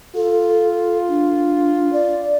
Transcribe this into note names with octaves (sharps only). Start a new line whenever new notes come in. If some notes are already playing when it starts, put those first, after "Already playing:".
F4 A4
D4
D5